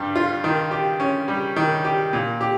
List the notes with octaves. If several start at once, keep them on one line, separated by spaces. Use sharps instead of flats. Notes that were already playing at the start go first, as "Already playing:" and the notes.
Already playing: G2 G3
F4
D#3
G4
C#4
G3
D#3
G4
A#2
G4